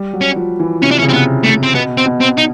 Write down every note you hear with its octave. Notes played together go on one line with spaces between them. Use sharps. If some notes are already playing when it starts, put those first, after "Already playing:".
Already playing: G3
F#3
C#4
F3
E3
C3 C#4
D4
C#4
C#3
C4
C3 B3
C3 A3
C4
B2 B3
C4
B2
C4
D#4